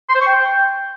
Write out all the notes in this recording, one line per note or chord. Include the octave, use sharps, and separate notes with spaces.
C6
C5
C#6
G5